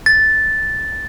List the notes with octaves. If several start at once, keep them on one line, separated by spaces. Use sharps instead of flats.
A6